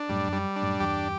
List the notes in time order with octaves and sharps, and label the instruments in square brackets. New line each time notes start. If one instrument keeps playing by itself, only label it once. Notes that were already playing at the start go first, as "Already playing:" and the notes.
Already playing: [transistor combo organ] D4
[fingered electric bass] F#2 A2 [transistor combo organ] G3
[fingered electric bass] F#2 [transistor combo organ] G3
[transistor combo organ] D4
[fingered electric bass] F#2 A2
[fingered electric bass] E2 G2 [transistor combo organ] G4